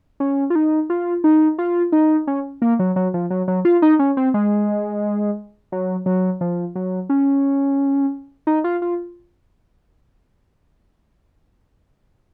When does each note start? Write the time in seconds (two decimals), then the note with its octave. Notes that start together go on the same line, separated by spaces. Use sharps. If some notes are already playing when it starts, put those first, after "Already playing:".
0.20 C#4
0.50 F4
0.55 D#4
0.90 F4
1.24 D#4
1.58 F4
1.92 D#4
2.27 C#4
2.62 A#3
2.79 F#3
2.96 F#3
3.14 F3
3.30 F#3
3.48 F#3
3.65 F4
3.82 D#4
3.99 C#4
4.17 C4
4.34 G#3
5.72 F#3
6.06 F#3
6.41 F3
6.75 F#3
7.09 C#4
8.47 D#4
8.64 F4
8.82 F4